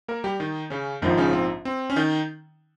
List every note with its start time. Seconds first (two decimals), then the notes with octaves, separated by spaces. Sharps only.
0.08 A#3 A#4
0.24 G3 G4
0.40 D#3 D#4
0.70 C#3 C#4
1.02 A#1 G#2 D#3 F3 D#4
1.17 C#3 C#4
1.33 C4
1.65 C4
1.90 C#4
1.96 D#3 D#4